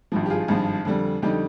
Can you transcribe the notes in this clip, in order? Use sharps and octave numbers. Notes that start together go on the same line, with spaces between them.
G#1 G2 F3
G4
F4 G#4
G#1 G2 F3
F2 D3 G3
F2 D3 G3 D#4 G4